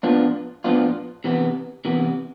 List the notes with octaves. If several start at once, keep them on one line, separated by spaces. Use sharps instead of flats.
A2 F3 B3 D4 F4
A2 F3 B3 D4 F4
C3 E3 B3
C3 E3 B3